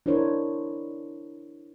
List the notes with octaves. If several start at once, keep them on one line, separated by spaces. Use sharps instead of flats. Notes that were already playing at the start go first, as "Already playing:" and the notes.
D4 E4 A#4 C5 C#5